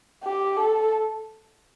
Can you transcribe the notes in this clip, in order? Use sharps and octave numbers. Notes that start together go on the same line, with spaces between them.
G4
A4